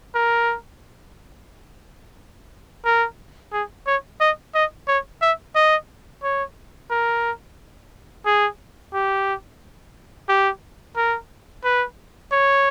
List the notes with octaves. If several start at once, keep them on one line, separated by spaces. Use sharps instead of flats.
A#4
A#4
G#4
C#5
D#5
D#5
C#5
E5
D#5
C#5
A#4
G#4
G4
G4
A#4
B4
C#5